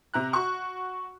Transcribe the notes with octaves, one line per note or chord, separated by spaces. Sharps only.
C3 A#5 F#6
F#4 C#6